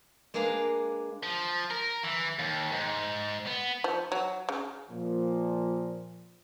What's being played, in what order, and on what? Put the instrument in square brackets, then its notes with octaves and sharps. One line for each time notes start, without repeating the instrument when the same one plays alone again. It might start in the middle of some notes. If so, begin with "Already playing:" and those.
[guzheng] G#3 A#3 D4 G#4 B4 F5
[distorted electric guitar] F3
A#4
E3
D#2
G#2
B3
[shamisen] F3
F#3
C#3
[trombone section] A#2 F3